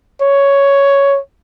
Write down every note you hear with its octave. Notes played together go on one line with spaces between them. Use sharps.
C#5